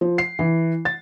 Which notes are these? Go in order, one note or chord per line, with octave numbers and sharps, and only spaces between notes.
F3
C7
E3
A6